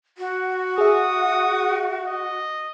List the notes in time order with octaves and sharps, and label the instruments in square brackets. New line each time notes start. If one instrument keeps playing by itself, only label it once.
[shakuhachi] F#4
[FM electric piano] G#4 E5 [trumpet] D#6
[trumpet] D#5